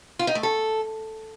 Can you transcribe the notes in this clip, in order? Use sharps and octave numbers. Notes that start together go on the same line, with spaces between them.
F4
D#4
A3
A4